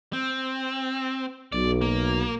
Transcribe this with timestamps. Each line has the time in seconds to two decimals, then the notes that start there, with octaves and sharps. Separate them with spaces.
0.13 C4
1.52 B1 D5
1.82 A#3